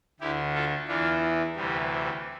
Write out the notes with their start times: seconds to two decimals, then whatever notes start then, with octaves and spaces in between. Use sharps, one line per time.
0.20 D2 D3 E4 G4
0.55 F4 A4
0.88 E2 E3 D4 F4
1.55 D2 C3 E3 G3